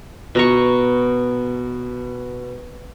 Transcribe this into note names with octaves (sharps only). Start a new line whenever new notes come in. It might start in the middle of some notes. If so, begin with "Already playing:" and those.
B2 A#5 C#6